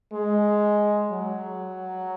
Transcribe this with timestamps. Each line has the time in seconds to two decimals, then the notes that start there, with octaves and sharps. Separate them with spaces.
0.13 G#3
1.11 F#3